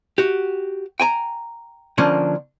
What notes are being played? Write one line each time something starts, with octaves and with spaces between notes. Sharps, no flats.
F#4 G4
G5 G#5 A#5
D3 F3 A#3 C#4 D4